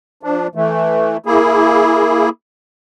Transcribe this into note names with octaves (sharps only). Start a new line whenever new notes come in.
F3 D4
E3 A3
A#3 E4 G#4